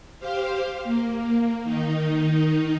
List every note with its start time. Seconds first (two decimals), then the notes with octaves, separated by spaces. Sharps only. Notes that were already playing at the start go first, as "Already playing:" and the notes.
0.19 G4 C5 F5
0.84 A#3
1.64 D#3 D#4